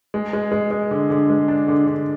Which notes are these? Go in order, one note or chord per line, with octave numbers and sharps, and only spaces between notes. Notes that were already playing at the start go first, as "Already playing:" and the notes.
G#3
G#3
G#3
G#3
D3
D3
G#3
D4
D3
D3